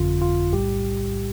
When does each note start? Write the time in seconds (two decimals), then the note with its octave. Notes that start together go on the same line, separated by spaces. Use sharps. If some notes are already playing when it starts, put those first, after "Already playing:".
Already playing: G1 F2 D3 F4
0.22 F4
0.53 B1 A2 G3 G4